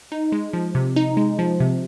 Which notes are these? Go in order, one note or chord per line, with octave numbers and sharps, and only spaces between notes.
D#4
G#3
F3
C3
D#4
G#3
F3
C3